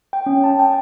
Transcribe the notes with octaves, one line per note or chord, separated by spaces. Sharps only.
G5
C#4
A5
G5